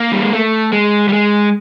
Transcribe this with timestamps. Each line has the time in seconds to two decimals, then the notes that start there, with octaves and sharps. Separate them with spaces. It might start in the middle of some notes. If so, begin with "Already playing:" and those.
Already playing: A#3
0.12 G3
0.22 G#3
0.33 A3
0.73 G#3
1.08 G3
1.13 G#3